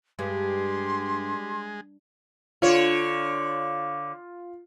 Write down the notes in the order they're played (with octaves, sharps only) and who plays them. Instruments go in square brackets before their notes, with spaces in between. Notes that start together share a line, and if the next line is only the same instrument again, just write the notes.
[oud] G2 [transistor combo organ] G#3 [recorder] G4 [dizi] C6
[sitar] D3 C#5 [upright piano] F4